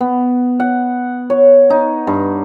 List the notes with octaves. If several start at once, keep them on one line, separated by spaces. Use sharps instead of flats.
B3
F#5
C#5
D#4
G2